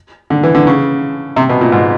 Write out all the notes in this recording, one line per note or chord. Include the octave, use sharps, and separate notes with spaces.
D3
E3
D3
C#3
C3
B2
A#2
G#2